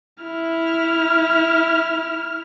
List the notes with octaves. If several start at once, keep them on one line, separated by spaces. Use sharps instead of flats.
E4 F6